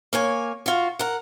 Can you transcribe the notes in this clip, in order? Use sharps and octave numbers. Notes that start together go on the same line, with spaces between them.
A#3 C#5 G#5
F4 F#4
A#4 F#5